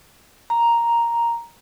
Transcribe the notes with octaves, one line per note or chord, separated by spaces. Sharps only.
A#5